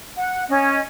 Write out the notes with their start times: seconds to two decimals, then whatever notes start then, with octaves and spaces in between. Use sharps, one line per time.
0.17 F#5
0.49 C#4 D#5